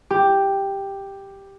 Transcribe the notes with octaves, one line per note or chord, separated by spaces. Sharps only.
G4